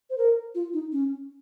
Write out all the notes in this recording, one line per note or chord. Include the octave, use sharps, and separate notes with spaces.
C5
A#4
F4
D#4
C#4